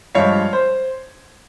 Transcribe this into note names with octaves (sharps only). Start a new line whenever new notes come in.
G2 F3 G#3 C#5 F5
C5